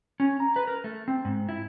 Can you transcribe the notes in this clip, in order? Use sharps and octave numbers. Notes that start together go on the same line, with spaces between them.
C#4
A#5
B4
A#4
A3
C4
G#2
E4